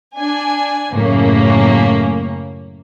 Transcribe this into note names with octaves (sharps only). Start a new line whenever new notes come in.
D4 G#5
F#2 A2 C#3 A#3 C#4